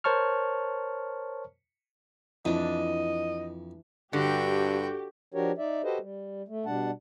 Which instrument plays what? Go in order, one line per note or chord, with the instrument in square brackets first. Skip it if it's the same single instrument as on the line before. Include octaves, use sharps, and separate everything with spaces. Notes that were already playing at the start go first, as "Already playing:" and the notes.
[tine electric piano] A#4 C5 C#5 A5 C#6 F6
[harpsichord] F2 [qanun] E3 D4 [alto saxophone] D#5
[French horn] G2 [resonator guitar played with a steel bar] D3 [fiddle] F#4 G5 [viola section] G4
[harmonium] F3 D4 F#4 G4 A#4 C#5
D#4 D5 E5
F#4 G4 A4 B4 C5 D#5
G3
A3
B2 G3 D4 F#5 A5